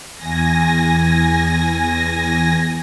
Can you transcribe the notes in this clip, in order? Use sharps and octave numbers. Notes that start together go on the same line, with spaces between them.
E2 G#5 A#6